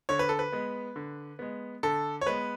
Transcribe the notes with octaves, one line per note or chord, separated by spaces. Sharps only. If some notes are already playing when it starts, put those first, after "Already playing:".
D3 C#5
B4
A4
B4
G#3 B3
D3
G#3 B3
D3 A4
C#5
G#3 B3 B4